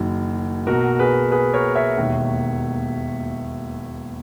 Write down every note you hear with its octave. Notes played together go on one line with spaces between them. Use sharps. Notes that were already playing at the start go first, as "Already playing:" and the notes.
Already playing: F#1 F#2 D#3
B1 B2 F#4 A#4
G#4 B4
G#4 B4
A#4 C#5
C#5 E5
E1 D#2 D#3